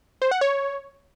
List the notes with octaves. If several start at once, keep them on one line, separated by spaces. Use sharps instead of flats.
C5
F#5
C#5